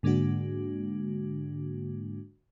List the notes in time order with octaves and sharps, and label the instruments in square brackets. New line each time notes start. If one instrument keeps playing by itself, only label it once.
[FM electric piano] G#2 D3 G#3 A#3 D4 F#4